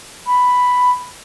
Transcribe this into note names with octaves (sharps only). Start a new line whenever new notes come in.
B5